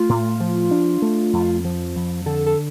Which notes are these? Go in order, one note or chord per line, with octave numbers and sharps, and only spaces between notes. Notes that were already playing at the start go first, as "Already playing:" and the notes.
Already playing: A3 F4
A2
F3
D4
A3
F2
F3
F2
D3 A4
A4